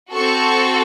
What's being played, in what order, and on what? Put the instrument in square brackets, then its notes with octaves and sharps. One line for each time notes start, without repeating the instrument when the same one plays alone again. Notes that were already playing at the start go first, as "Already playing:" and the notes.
[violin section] C4 F#4 A4 C#6